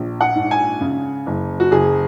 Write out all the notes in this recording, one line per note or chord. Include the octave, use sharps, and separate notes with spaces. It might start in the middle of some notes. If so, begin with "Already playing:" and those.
Already playing: A#1
F#5
G#2
G#5
C#3
F#1
F#4
F#1 G#4